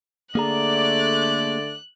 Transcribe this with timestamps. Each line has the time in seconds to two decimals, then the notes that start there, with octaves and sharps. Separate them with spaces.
0.35 D3 A3 A#3 G#4 D5 A#5 F#6